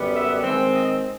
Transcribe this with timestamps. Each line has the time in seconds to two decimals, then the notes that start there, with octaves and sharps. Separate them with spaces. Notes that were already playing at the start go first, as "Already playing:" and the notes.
Already playing: F#2 D3 G3 B3
0.13 E5
0.42 D#3 G#3 C4
0.71 D#5